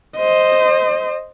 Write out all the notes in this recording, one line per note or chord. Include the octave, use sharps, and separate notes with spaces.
C5 D#5